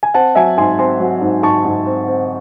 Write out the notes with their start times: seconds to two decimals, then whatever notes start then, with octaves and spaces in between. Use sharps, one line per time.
0.03 G#5
0.14 C4 F#5 A5
0.35 F#3 E5 G#5
0.57 G#2 G#5 C6
0.79 C4 G#5 C6
1.00 F#3
1.21 G#2
1.43 G#2 A5 C#6
1.65 G#2
1.86 C4
2.08 C4